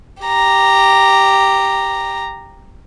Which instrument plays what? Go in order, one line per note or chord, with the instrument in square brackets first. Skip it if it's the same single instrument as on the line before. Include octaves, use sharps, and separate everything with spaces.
[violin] G4 A#5